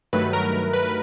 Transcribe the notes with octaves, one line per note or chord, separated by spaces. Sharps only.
G2 D#3 F#3 A3 B4
A#4
B4